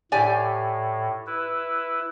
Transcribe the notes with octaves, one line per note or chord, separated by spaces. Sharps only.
A2 G4 D5 G#5
E4 B4